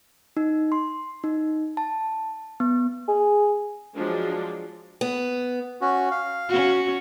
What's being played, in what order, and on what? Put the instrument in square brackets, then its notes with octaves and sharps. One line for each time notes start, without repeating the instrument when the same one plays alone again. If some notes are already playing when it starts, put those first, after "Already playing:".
[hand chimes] D#4
C6
D#4
A5
B3
[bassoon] G#4
[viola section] F3 F#3 G#3 D4
[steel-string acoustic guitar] B3
[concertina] C#4 F#4
F5
[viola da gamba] C#4 F#4